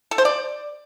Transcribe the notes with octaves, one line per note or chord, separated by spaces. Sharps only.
A4
C5
D5